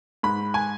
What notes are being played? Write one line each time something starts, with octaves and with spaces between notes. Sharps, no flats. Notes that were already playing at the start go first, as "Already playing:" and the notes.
G#2 B5
G#5